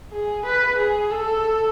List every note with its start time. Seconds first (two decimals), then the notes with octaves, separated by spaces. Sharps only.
0.12 G#4
0.45 B4
0.78 G#4
1.11 A4